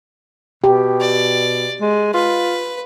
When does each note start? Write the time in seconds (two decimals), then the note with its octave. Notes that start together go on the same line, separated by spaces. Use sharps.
0.64 B2 G4
1.00 D5
1.81 G#3
2.14 F4 B4